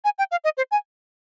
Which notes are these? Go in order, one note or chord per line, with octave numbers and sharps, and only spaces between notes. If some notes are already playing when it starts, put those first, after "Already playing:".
G#5
G5
F5
D#5
C5
G#5